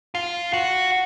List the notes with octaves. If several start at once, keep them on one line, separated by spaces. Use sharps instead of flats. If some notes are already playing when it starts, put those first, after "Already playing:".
F4
F#4